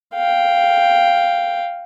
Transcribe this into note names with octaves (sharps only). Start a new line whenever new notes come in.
F5 G5